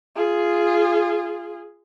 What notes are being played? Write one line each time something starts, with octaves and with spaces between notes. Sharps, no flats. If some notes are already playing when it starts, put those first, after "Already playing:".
F4 G#4